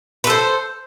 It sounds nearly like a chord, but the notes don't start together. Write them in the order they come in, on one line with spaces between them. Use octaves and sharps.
B4 A4 C5